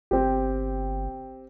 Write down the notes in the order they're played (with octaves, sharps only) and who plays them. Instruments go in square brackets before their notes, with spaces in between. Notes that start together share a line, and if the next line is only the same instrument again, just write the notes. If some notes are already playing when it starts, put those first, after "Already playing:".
[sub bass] G1 [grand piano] C4 G4